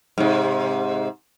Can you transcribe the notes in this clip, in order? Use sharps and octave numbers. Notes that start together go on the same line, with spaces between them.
G#2 C3